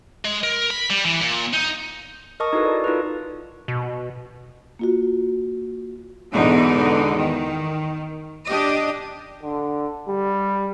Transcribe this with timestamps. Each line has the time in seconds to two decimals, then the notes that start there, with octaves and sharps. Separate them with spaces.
0.25 G#3
0.43 A#4
0.70 B5
0.90 G3
1.05 E3
1.21 A#2
1.53 D#4
2.40 A#4 D#5 A5 C#6 D#6
2.53 D#4 E4 F#4 A4 B4
2.65 D5
2.84 D#4 F4 A4 B4
3.68 B2
4.79 A#3 F4 F#4
6.32 E2 G#2 B2 D3 D#4
7.17 D#3
8.47 D4 G4 D#5
9.43 D3
10.08 G3